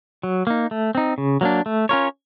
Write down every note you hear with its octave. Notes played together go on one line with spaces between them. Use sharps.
F#3
A#3 D#4
A3
C4 D#4
C#3
F#3 A#3 D4
A3
C#4 F4 A#4 C#5